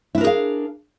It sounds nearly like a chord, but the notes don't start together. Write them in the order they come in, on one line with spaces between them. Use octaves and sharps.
E4 D4 A#4 G#4 F5